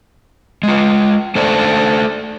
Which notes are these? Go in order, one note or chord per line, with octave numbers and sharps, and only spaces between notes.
G#3 F4
A3 A4 C5 D5 A5